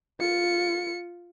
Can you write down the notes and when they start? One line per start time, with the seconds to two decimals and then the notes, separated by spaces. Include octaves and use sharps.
0.20 F4 C#7